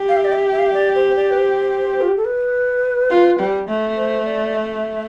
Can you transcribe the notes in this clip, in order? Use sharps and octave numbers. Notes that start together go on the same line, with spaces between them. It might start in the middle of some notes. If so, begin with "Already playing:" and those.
Already playing: G4
F5
E5
D5
E5
E5
F5
E5
D5
C5
D5
B4
C5
F4
G4
A4
B4
F4
G3
A3
C5
D5
D5
E5